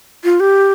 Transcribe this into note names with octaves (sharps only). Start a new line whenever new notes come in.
F4
G4